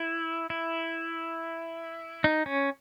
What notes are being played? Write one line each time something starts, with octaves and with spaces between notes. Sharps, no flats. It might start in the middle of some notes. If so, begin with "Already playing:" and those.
Already playing: E4
E4
D#4
C#4